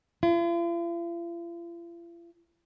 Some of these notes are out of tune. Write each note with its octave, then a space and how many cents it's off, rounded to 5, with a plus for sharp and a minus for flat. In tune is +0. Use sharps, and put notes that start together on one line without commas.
F4 -45